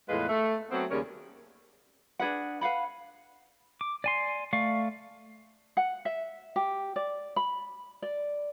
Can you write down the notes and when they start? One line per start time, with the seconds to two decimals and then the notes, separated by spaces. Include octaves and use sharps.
0.09 E2 A2 G#3 F4 B4
0.28 A3
0.71 F#3 A3 B3 C4
0.90 D#2 C#3 G3 C#4 A#4 C#5
2.19 D4 G#4 B4 F#5
2.61 B4 F5 F#5 B5
3.81 D6
4.04 D5 G#5 C6
4.53 A3 D5 F5 C#6
5.77 F#5
6.05 E5
6.56 G4
6.96 D5
7.36 B5
8.02 D5